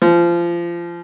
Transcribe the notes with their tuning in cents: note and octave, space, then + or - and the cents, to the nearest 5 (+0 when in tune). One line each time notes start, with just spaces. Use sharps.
F3 -25